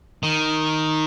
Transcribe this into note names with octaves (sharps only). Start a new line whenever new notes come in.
D#3